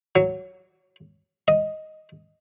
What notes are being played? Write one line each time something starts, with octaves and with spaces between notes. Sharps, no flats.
F#3
D#5